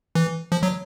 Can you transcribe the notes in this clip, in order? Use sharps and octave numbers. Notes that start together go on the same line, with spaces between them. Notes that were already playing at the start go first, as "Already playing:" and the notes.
E3
F3
F#3